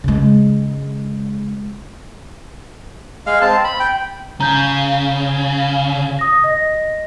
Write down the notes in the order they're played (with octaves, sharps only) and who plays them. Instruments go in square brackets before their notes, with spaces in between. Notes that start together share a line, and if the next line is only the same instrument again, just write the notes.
[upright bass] C#3 G#3
[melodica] G#3 F5
C4 A5
B5
G5
[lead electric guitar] C#3 [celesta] A#5 G6
[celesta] D#6 A#6
D#5 A#6